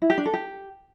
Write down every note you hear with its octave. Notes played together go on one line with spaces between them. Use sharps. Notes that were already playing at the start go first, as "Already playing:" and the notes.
E4
G4
D4
A4
G4